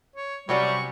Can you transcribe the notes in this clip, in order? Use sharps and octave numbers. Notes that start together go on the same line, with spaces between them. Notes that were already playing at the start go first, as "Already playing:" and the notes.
C#5
C3 F#3 G3 C#4 C#6